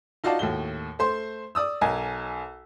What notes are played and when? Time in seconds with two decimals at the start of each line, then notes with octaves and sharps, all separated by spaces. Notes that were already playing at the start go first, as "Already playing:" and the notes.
0.24 D#4 F4 F#4 D5 F5 A5
0.39 D#2 A2 F#4 G7
0.99 A3 C5 C6
1.55 D5 D#6 E6
1.81 B1 A#4 D#5 G#5